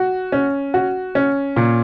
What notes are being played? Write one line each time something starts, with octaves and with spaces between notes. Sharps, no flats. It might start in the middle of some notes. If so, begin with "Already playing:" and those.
Already playing: F#4
C#4
F#4
C#4
A#2